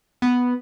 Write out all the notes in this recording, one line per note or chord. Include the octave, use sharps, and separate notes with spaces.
B3